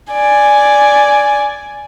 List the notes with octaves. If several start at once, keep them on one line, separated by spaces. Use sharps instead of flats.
D5 G#5